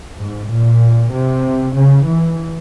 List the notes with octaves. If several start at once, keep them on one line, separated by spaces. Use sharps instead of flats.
G#2
A#2
C3
C#3
E3